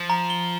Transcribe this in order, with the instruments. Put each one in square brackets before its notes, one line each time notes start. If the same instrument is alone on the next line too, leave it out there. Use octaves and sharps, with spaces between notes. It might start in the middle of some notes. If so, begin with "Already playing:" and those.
Already playing: [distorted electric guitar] F3
[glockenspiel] A#5
G7